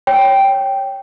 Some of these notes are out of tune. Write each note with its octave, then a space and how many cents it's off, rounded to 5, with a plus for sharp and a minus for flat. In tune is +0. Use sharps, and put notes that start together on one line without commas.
C#5 +0 G5 +0